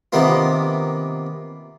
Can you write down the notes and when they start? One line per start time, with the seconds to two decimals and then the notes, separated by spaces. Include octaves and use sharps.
0.12 C3 D#3 A#3 B3 F4